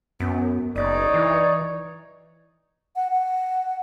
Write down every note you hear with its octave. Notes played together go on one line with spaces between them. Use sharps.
F#2 B3
F#1 D#4 C#5 D5
E3
F#5
F#5